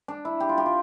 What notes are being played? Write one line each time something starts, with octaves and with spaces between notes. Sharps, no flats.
D4
E4
G4
F4
G4
F4